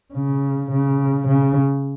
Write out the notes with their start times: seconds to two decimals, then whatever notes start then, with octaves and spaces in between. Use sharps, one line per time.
0.14 C#3
0.71 C#3
1.27 C#3